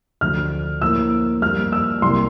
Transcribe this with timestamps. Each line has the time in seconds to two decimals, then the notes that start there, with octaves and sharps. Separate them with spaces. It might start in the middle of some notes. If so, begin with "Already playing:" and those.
0.21 D2 D3 F3 F6
0.82 A2 F3 A#3 E6
1.42 G2 F3 A#3 F6
1.72 E6
2.02 C2 C3 G3 A#3 C6